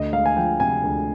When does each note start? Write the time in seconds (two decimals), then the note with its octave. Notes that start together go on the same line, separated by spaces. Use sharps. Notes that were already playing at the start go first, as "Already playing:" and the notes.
Already playing: D2 D#5
0.13 G#3 F5
0.26 G#5
0.37 F3 G5
0.60 C3 G#5
0.84 D2